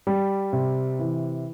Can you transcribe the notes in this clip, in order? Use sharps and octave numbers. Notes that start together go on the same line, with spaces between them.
G3
C3
E3